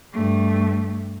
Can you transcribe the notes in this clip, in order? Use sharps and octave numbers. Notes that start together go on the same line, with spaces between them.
G2 A3